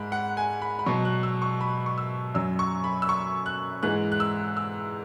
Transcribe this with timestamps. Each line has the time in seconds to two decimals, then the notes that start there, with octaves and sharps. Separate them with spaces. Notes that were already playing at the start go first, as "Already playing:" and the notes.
Already playing: G#2 G#3 B5
0.12 F#5
0.37 G#5
0.62 B5
0.79 B5
0.86 B2 F#3 C#6
1.05 F#6
1.23 E6
1.42 C#6
1.61 B5
1.86 C#6
1.98 E6
2.35 F#2 F#3 E6
2.59 C#6
2.84 B5
3.02 E6
3.09 C#6
3.46 F#6
3.83 G#2 E3 G#3 F#6
4.12 F#6
4.20 E6
4.57 E6